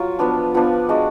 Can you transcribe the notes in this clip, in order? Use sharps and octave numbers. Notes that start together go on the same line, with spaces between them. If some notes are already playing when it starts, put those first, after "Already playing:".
Already playing: F#3 F4
F3 B3 D4
F3 B3 D4
G#3 D4 F#4